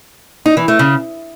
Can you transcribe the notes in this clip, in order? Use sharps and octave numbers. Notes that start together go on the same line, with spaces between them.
D#4
E3
A3
C#3